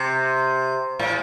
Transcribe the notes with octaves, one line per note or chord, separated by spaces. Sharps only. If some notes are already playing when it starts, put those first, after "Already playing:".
Already playing: C3
A2